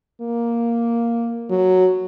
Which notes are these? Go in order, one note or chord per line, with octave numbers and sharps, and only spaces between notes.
A#3
F#3